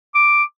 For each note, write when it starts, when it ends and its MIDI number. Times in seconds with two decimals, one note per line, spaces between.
0.15 0.43 86